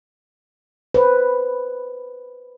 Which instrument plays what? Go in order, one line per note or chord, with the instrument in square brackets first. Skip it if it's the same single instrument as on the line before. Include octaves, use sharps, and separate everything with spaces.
[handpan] B4 C5